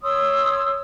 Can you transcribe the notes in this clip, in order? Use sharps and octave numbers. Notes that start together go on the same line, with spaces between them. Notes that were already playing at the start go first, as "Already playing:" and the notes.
C#5 C6 D#6 E6